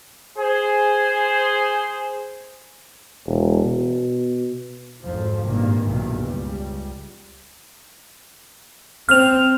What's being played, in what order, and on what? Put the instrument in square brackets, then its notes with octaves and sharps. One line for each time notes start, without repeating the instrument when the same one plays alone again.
[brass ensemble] G#4 C5
[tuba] E1
B2
[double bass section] G#1 F2 F3
G#1 G2 A#2 D#3 A#3
B1 E2 G2 A#2 D#3
C#2 G3
[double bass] C4 [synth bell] F6 F7